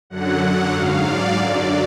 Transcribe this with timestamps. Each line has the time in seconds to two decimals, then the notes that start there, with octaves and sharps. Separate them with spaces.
0.10 F#2 D3 F#3 F#5
0.73 G#2 F#3 F5
1.05 D5
1.36 F#2 D3 F#3 D5